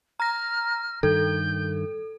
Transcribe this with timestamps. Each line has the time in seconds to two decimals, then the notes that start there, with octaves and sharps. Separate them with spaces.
0.20 A#5 F6 A#6
1.03 G2 D#3 A4 G6